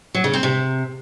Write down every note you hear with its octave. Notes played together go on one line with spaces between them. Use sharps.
F#3
C#3
C4
C3